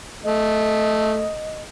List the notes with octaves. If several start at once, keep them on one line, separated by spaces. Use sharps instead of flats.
A3 D#5